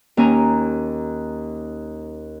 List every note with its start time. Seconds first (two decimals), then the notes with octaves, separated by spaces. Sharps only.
0.17 D#2 C#4 G#5 A#5